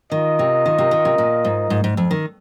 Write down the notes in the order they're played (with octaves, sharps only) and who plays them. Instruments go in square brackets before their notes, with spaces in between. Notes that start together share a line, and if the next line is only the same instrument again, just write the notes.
[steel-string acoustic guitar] D#3 [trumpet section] F4 A#4 D#5
[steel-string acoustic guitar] C3
D#3
C3
D#3
C3
A#2
G#2
G#2
G#2
F2
D#3